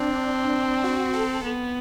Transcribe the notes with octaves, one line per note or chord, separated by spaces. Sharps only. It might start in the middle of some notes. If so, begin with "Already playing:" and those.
Already playing: C4 D4
F#4
A4
B3